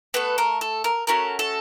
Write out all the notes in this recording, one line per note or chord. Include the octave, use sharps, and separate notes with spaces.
A3 B3 A4 B4
A#4
A4
A#4
A3 C#4 F#4 A4 A#4
A4